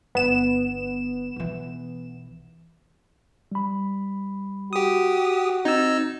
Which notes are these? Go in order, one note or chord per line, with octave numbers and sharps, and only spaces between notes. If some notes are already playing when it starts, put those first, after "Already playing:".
G1 B3 E7
B1 E3
G3 B5
F#4 G4 D#6
C4 D#4 E6 G#6 A6